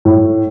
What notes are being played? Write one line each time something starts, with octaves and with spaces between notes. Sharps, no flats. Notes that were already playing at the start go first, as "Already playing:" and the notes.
A2